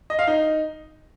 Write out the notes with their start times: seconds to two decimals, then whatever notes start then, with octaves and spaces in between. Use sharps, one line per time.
0.10 D#5
0.19 F5
0.27 D#4